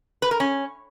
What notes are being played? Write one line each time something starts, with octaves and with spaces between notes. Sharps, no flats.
B4
A#4
C#4